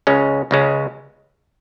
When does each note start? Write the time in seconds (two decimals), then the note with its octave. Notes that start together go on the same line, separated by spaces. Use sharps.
0.07 C#2 C#3 G#3 C#4
0.51 C#2 C#3 G#3 C#4